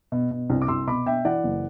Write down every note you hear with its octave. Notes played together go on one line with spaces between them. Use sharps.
B2
B2
C2
D6
C2 C6 E6
B2 B5 D6
B2 E5 G5
E3 D5 F#5
F#1